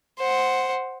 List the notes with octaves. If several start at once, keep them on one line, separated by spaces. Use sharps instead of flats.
C5 F#5